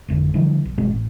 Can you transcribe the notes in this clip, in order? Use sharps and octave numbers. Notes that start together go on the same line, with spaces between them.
G#1 F2 D3
D3 E3 F3 G3
B1
G1 B2 G#3 C4
A1